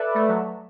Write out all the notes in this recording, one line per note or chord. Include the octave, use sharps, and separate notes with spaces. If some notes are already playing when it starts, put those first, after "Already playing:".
Already playing: A4 B4 D5 E5
A3
F#3